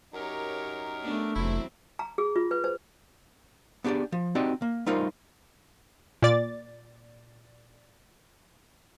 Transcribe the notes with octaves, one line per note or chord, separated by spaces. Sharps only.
F#2 D#4 G4 A#4 C#5
A3 B3 D4
F1 E2 F#3 C4 E4
A#5
G#4
F4
B4
C5
B3 D4 G4 G#4 D5
F3
C4 D#4 F#4 G4 D5 D#5
A#3
G3 A3 D#4 F4 A#4 C5
A#2 D5 A6